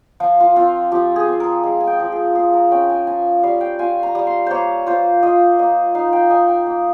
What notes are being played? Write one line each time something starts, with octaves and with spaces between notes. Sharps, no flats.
F3 F4
F4
C4 F4
F3 G4
G#4
C4
A#4
G#3 A#4
G#5
G5
F3
G#4
F4 G#4
A#4
C#4 G5
G#5
F4 G#5
G3 F5
G5
F4 G#5
A#5
G3
C6
A#3 C5 C#5
F4 C5
F4 D#5
A#3 D#5
D#4 F5
G5
D#4 G#5
G5
A#3